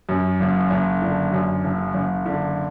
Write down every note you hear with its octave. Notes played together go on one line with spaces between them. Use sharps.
F#2
F#1
F#1
D3
F#2
F#1
F#1
D3